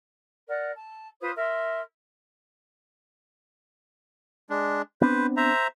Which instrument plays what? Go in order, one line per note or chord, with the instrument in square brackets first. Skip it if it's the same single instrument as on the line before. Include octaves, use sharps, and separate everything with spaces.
[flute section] A#4 D5 F#5
A5
F4 B4 C5 D#6
A#4 E5 C6
[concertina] G#3 D4
[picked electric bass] B3 C4 D4 [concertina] B4 C5
[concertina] C5 E5 A#5